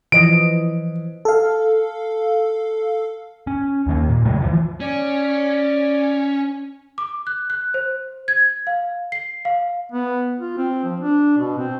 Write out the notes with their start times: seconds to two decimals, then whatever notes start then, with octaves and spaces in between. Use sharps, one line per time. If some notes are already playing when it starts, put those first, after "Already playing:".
0.12 E3 F3 D#5 D7
1.25 A4 F5
3.47 C#4
3.87 D#2 D#3 A#3
4.09 A#2
4.25 C#2 F#2 G#3 A3
4.42 E3 F3
4.80 C#4 D5
6.98 D6
7.27 F#6
7.50 F#6
7.74 C5
8.28 G#6
8.67 F5
9.12 C7
9.45 F5
9.92 B3
10.39 F4
10.57 C4
10.84 F3
11.00 D4
11.38 B2
11.58 C4